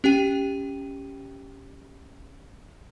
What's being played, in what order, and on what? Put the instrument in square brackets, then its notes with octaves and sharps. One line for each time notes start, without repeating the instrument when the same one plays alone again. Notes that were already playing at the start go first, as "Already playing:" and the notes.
[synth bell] C#4 G4 G5 D#7